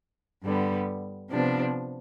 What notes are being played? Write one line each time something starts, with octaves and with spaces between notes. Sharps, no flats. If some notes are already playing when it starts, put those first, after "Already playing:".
G2 D3 G3 B3
C3 F3 B3 D4